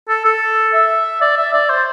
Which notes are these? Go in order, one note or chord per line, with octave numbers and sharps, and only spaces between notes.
A4
A4
E5
D5
E5
D5
C5